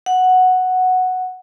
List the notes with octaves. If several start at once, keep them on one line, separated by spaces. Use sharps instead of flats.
F#5